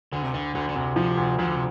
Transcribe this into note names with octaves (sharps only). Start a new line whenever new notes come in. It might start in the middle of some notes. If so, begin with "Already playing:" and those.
D2 D3
C3
D2 D3
D2 D3
D3
D2 C3
C3 F3
D2
D2 F3
D3
C3